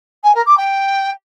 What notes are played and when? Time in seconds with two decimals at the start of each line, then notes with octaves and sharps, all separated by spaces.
0.23 G#5
0.34 A#4
0.46 D6
0.57 G5